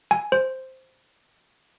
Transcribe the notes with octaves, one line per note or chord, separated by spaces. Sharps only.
G#5
C5